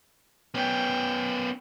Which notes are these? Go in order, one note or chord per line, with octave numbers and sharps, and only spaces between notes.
B3 C#4 G5